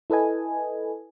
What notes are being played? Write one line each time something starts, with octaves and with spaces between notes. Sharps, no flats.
E4 A4 B4 D#5 G#5